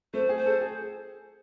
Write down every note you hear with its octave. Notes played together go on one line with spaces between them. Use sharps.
A3 C5
G#4
C5
A4
G#4